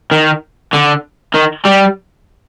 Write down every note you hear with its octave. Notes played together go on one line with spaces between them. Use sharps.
D#3
D3
D#3
G3